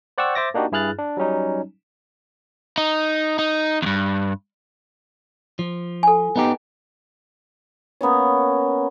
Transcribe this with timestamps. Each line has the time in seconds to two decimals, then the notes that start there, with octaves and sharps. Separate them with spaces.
0.18 C5 D5 F#5 G5 C#6 E6
0.35 C5 E5 D6 A6 A#6
0.54 A#3 D4 D#4 F#4 G4
0.72 G2 E4 G#4 F6 F#6 A6
0.98 D4
1.17 F#3 G3 C#4 D#4
2.78 D#4
3.39 D#4
3.82 E2 G2
5.59 F3
6.03 A4 G#5
6.36 B3 D#4 G4
8.01 A#3 B3 C#4 C#5